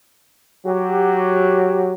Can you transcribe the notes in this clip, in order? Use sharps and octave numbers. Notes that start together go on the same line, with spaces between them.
F#3 G4